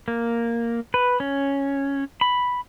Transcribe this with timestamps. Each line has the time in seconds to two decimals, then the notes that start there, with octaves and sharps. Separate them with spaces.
0.08 A#3
0.94 B4
1.20 C#4
2.21 B5